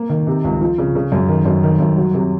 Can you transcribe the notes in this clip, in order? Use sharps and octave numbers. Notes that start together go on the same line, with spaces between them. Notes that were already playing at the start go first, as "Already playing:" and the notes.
Already playing: A#3
D#3
C3
C#2
F3
C#3
C#3
F#2
D#3
F#2
D#3
F#2
F#3
C3